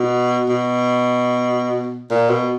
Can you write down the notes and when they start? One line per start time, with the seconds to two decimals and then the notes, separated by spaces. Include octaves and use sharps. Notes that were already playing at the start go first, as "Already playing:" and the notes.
Already playing: B2
0.49 B2
2.11 A#2
2.30 B2